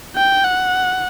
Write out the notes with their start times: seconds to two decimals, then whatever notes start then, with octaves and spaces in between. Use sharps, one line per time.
0.16 G5
0.44 F#5